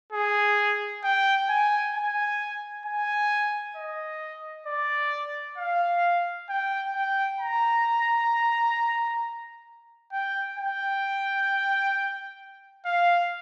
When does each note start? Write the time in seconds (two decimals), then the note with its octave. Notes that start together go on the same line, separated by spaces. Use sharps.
0.12 G#4
1.04 G5
1.49 G#5
1.95 G#5
2.86 G#5
3.76 D#5
4.67 D5
5.58 F5
6.49 G5
6.95 G5
7.40 A#5
10.12 G5
10.58 G5
12.85 F5